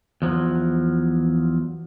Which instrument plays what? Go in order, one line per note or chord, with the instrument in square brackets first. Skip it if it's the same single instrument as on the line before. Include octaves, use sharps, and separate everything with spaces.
[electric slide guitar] E2 F3 F#3